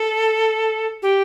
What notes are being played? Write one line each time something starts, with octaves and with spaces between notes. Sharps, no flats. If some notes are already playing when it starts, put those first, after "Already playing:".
Already playing: A4
G4